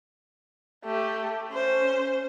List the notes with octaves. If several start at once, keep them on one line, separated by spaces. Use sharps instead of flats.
A3 G4
C#4 C5